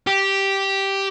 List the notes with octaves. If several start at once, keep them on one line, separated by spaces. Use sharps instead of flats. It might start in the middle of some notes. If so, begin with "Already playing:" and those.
G4